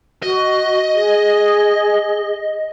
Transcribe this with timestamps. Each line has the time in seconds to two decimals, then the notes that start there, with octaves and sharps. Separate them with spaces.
0.23 F#4 D#5
0.94 G#4